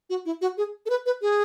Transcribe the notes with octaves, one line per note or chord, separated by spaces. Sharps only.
F#4
E4
F#4
G#4
A4
B4
B4
G#4